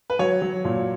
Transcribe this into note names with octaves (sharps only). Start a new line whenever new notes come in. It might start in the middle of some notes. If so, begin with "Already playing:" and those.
B4
F#3 C#5
F#3
A#2